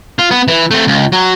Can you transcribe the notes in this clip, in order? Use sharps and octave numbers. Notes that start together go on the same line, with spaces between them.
F4
B3
E3
A3 C4
C#2
F#3